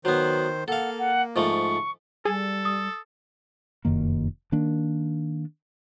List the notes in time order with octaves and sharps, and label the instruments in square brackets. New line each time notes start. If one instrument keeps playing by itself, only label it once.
[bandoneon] D#3 C5 [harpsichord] F#3 B3
[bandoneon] A#3 [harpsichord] A4 F5 [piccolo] F#5
[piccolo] F#5
[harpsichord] G#2 F3 A3 [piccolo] C#6
[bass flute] G3 [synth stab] G#4 [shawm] A4
[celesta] D#6
[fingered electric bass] F1 F#2 D#3 A#3
D#3 A#3 D4